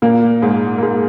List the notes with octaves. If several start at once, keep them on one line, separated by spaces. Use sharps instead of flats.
A#2 A#3
G#2 G#3
A#3
G#2 G#3